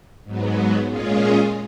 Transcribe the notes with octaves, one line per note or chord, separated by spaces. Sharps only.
G#2 F#3 B3
A#2 G#3 C#4 F4 G#4